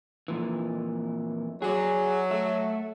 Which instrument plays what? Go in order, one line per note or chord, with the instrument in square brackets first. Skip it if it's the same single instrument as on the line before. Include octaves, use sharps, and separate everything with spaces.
[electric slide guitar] F2 A#2 E3
[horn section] F#3 [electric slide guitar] G#4 D5
[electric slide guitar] A3 E5